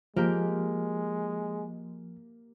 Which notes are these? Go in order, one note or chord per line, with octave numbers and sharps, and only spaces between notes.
F3 G#3 A#3 G4